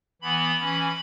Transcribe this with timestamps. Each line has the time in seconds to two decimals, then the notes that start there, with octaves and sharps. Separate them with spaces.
0.22 E3 B3 B5
0.60 E3 C#4